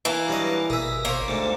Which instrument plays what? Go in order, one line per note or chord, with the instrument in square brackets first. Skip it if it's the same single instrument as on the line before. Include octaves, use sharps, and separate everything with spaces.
[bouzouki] E3 A#3 [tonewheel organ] A5
[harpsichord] G2 F#3 D#5
[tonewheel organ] G#1 B2 A#4 [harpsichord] G#4 E5
[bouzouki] A#3 [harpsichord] C5 C#5
[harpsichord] D2 G#2 [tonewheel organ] A3